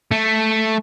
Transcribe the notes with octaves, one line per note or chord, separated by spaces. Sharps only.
A3